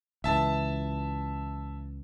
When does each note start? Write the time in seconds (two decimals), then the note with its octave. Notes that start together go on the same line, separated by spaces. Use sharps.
0.24 C#2 E3 E5 A5